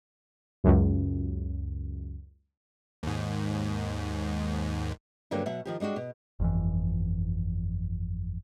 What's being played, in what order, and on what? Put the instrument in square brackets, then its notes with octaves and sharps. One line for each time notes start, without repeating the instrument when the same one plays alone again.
[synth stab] C#2 F#2
[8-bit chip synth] D#2 G#2
[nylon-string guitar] G2 D3 F#3 A#3 G5
B2 F#3 E5 F#5
D#3 F3 G4
G3 G#3 D4 F#4 G4
B2
[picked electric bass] G1 F2 E3